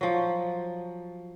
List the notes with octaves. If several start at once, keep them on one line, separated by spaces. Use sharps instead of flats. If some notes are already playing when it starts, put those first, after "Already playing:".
F3 F#3